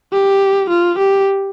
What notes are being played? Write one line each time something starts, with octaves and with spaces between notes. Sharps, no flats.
G4
F4
G4